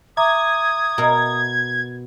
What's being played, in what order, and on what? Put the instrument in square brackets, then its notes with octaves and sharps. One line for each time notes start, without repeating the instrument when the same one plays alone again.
[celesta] E5 A#5 D6 [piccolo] D#6 [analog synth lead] G#6
[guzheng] B2 A#4